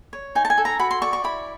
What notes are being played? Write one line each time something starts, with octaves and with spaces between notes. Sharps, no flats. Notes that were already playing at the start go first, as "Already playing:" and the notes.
C#5
D#4 G#5
A5
G#5
A4
A#5
F#4 B5
C6
D5 C#6
C#6
E4 B5